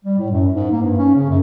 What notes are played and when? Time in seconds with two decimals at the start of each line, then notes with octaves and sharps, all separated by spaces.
0.05 G3
0.19 A2
0.31 F#2
0.55 G#2
0.72 A#3
0.83 G2
0.98 C#4
1.15 C#3
1.29 F#2